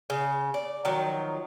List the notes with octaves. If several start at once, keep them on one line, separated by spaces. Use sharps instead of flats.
C#3
D5
D#3 F3 F#3